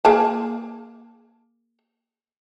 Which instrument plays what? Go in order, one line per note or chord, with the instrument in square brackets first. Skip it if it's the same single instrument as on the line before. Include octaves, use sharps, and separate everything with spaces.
[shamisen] A#3 G#4 A5